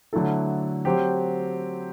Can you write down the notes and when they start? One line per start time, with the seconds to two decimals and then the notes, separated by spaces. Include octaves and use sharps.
0.13 D3 F#3 A3 E4 A4
0.85 F#3 C4 G4